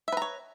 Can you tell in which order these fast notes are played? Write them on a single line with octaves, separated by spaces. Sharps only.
E5 B4 A#5 C#5